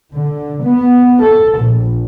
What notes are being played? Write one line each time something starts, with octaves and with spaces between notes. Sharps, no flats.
D3
B3
A4
A#1